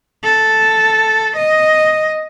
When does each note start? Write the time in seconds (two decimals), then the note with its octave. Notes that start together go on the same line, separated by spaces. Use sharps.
0.24 A4
1.37 D#5